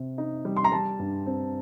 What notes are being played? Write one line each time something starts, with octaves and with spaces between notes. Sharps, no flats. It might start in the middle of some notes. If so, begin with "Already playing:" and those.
Already playing: C3 C4
D#4
G3
C6
A#5
G3 A5
G2
C4